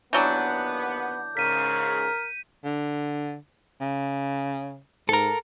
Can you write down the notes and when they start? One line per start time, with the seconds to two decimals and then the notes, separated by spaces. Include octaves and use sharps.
0.13 D#2 E3 F#3 B3 D4 G6
1.37 G#2 C#3 A#4 B6 D#7
2.64 D3
3.81 C#3
5.09 G#2 A4 A#4